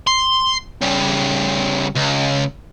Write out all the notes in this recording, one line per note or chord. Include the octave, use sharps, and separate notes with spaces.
C6
C#3 G3
C#2